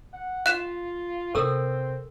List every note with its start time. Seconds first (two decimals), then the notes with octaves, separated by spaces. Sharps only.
0.14 F#5
0.46 F4 F5 F#6 E7
1.35 C3 C4 A4 A#4 E6